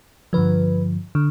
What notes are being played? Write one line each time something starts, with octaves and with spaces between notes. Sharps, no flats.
G2 D3 F3 B4
D3